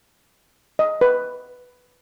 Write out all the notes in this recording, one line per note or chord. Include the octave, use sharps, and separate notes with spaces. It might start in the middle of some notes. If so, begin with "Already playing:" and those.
D#5
B4